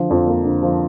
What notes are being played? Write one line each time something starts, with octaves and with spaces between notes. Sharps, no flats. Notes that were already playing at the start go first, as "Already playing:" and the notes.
Already playing: D3 F3
F2
A#3
D3
F3